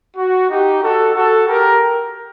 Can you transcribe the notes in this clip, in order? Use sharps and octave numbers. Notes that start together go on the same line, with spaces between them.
F#4
D#4 G4
F#4 A4
F#4 A4
G4 A#4